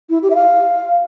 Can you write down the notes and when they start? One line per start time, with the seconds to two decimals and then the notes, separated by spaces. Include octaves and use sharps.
0.10 E4
0.23 G4
0.30 E5
0.35 F5